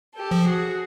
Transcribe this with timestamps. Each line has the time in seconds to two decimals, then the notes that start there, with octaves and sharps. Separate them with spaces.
0.16 G4 A4
0.31 F3
0.46 F#4 G#4